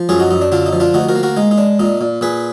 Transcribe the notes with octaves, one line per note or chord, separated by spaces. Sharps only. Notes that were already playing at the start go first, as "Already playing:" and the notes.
Already playing: F3
F#2 F4 G#4
D#4 F#4
F#2 D#4
D4
D3 D4 F4
D#4
F3
D4 F4
D2 D#4 F#4
F#4 A#4
A#3
F#4 A#4
G#3 D#4
D#4
D4
A#2 D#4
A#2
A#2 G#4 B4